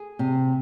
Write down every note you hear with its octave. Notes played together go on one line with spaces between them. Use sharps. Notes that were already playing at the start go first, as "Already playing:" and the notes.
Already playing: G#4
C3